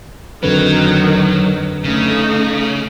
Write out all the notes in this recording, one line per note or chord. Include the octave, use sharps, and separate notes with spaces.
F2 D3 D#3 F#3 B4
C#3 A3 D#4